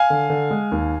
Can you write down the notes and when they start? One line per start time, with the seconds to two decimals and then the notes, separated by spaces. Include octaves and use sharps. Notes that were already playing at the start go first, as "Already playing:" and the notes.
Already playing: F5 G#5
0.10 D3
0.30 D3
0.51 G#3
0.72 D#2